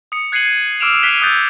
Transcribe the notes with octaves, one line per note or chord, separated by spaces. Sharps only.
D#6 C#7
F#6 G#6 C7 C#7 D#7 F#7
D6 E6 F6 D7 E7 F7
F#6 B6 C7 D#7 F7 G7
D#6 E6 F#6 G6 A6